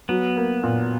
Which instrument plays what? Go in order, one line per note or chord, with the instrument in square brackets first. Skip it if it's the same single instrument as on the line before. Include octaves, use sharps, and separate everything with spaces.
[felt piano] F#3 [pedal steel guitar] B3
[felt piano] A#3
A#2